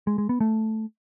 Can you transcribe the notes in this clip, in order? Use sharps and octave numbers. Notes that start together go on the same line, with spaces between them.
G#3
G#3
B3
A3